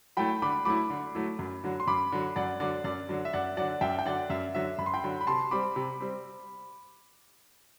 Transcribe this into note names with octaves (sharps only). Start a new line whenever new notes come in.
F#3 A3 E4 G5 B5
D3 B5 D6
F#3 A3 E4 B5 D6
D3
F#3 A3 E4
F#2
D3 F#3
C6
F#2 B5 D6
D3 F#3
F#2 D5 F#5
D3 F#3 D5
F#2 D5
D3 F#3
E5
F#2 D5 F#5
D3 F#3 D5 F#5
F#2 E5 G5
G5
D3 F#3 D5 F#5
F#2 E5
D3 F#3 E5
F#2 B5
C6
G5 B5
D3 F#3
B5
C3 A5 C6
G3 C4 B5 D6
C3
G3 C4